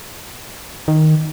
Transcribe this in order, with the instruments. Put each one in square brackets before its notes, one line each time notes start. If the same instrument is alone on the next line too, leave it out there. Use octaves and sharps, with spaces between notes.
[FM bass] D#3